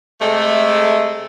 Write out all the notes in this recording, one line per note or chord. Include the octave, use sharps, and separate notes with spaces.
C3 G#3 A3